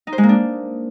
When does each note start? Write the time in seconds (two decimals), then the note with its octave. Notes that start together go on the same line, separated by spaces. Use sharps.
0.07 D#4
0.12 C5
0.18 G#3
0.23 A#3
0.29 D4